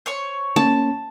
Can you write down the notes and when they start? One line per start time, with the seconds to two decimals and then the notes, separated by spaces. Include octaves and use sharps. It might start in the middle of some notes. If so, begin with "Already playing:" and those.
0.06 C5 C#5 C#6
0.56 A#3 C#4 A5